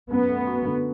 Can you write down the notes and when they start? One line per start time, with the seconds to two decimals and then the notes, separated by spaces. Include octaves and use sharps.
0.10 F#2 B3
0.29 A3
0.47 F#4
0.66 D3